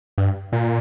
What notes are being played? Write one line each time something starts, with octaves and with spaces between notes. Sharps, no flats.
G2
A#2